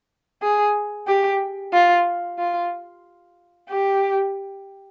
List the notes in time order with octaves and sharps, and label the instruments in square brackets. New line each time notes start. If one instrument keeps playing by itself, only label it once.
[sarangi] G#4
G4
F4
F4
G4